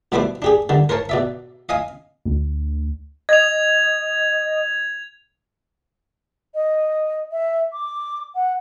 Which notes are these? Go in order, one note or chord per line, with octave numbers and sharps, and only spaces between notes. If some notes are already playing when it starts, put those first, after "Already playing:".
B2 G3 A3 E4 C5 D6
D4 G4 G#4
D3 G3
A#4 C5 C#5 A5
B2 D5 E5
D#5 F5 G#5 D#6
D2
D#5 G#6 F7
D#5
E5
D6
F#5